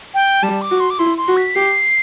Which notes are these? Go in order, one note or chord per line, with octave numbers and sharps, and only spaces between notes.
G5
G3 A5
D6
F#4
C6
D6
E4 C6
C6
F#4
B6
G4 C7